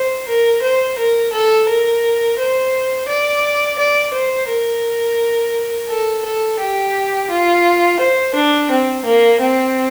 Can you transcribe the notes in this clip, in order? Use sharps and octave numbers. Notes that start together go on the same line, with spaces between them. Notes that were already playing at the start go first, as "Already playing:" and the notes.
Already playing: C5
A#4
C5
A#4
A4
A#4
C5
D5
D5
C5
A#4
A4
A4
G4
F4
C5
D4
C4
A#3
C4